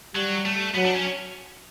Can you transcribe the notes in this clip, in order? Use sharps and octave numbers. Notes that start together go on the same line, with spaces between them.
F#3 G3
A3
F#3 B3
D4
C#4